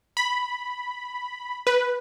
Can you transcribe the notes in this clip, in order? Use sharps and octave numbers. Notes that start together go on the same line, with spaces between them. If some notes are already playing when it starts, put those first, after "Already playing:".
B5
B4